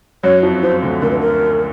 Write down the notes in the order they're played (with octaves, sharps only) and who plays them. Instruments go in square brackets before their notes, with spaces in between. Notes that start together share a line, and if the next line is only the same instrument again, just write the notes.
[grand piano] F#2 F#3 [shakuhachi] C#5
[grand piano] F2 F3
[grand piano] F2 F3 [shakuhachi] C5
[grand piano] D2 D3
[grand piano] D2 D3 [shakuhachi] A#4
[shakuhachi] B4
A#4